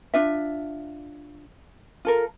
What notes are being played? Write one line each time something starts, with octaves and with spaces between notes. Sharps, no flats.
D4 F4 E5
F4 A4 A#4